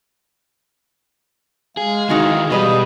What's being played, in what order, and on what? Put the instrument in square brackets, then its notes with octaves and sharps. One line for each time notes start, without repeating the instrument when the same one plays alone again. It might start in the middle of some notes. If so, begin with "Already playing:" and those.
[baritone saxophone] G#3 [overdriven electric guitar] G#4 [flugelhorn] F5
[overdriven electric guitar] D#3 E3 [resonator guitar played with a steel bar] D#4 F#4 G#4
[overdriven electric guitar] B2 [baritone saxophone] G3 [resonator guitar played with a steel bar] G#4 B4 D#5